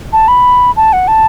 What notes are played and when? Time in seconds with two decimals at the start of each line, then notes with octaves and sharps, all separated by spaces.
0.13 A5
0.28 B5
0.76 A5
0.93 F#5
1.08 A5